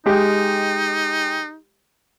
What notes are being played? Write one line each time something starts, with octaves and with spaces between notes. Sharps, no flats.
G#3 D#4 G4